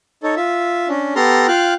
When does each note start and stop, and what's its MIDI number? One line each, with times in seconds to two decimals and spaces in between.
0.23 0.35 63
0.23 0.35 69
0.23 0.35 73
0.37 0.88 65
0.37 0.88 76
0.88 1.14 61
0.88 1.14 62
1.16 1.47 59
1.16 1.47 67
1.16 1.47 69
1.16 1.47 82
1.16 1.47 84
1.16 1.47 89
1.48 1.74 65
1.48 1.74 77
1.48 1.74 79
1.48 1.74 89
1.48 1.74 90